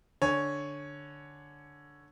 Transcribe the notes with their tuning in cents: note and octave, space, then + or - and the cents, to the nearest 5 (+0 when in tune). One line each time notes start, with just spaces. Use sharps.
D3 +0 C#5 +0 G#5 +0